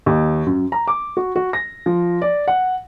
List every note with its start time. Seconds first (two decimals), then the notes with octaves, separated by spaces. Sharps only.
0.06 D#2
0.46 F#2
0.72 A#5
0.88 D6
1.17 F#4
1.36 F#4
1.53 A#6
1.86 F3
2.22 D5
2.48 F#5